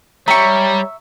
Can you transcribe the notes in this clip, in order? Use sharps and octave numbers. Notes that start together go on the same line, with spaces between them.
G3 C#5 E5 A#5 C#6